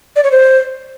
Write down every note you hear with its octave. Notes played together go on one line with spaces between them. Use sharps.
D5
C#5
C5